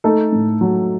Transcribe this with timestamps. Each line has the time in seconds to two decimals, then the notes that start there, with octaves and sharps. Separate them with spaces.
0.04 A3 D#4 A4
0.32 A2
0.61 F#3